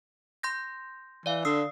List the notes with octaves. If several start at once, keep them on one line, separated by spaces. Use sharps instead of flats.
C6 G6 A#6
E3 D5 F5
D3 D#6 E6 C7